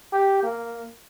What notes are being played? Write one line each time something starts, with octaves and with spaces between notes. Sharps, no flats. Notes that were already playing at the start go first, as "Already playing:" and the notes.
G4
A#3